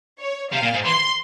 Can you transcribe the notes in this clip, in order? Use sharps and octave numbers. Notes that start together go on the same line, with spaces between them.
C#5
C3 F5
A#2
G#2
E3 C6